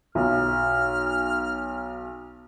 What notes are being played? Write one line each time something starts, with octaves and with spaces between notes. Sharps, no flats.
B1 F6